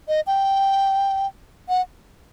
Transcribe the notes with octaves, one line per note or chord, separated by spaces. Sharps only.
D#5
G5
F#5